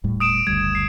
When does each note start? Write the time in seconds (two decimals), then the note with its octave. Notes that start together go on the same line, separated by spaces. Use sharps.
0.04 D#1 A2 G3
0.20 D#6 D7 E7
0.47 F#1 D2 G3 G#6
0.75 C7